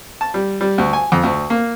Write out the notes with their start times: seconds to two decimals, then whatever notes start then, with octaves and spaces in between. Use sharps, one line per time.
0.21 A5
0.34 G3
0.61 G3
0.78 D2
0.93 G#5
1.12 F2
1.23 D2
1.50 A#3